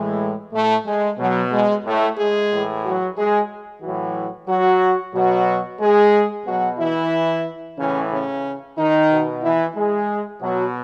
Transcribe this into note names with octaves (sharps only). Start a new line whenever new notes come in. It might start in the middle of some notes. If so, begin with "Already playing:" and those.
Already playing: A2 E3 G#3
A2 A3
G#3
B2 F#3
G#3
A2 A3
G#3 G#4
A2 E3
F#3 F#4
G#3 G#4
A2 E3 F#3 F#4
F#3 F#4
B2 F#3 F#4
G#3 G#4
B2 F#3 F#4
E3 E4
A2 C#3 E3 C#4
C#3 C#4
D#3 D#4
B2
E3 E4
G#3 G#4
B2 F#3 F#4